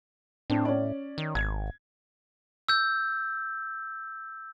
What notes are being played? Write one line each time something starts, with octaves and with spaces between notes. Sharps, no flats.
A2 C4 D4
C#4 D5
D#3
G#1 G#6
E6 G6